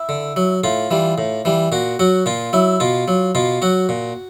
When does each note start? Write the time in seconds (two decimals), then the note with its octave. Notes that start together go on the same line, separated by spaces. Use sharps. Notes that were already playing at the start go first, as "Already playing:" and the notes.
Already playing: E4
0.09 D3
0.36 F#3
0.64 A2 F4
0.91 E3 G3
1.18 A2
1.45 E3 G3
1.72 A#2 F#4
1.99 F#3 F#4
2.26 A#2 F4
2.53 F#3 E4
2.80 B2 F4
3.08 F#3
3.35 B2 F4
3.62 F#3 F#4
3.89 A#2